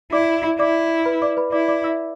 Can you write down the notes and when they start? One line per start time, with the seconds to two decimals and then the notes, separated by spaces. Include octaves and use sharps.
0.12 E4 D5 D6
0.59 E4 D5 D6
1.05 B4 B5
1.22 D5 D6
1.37 B4 B5
1.52 E4 D5 D6
1.68 D5 D6
1.84 E5 E6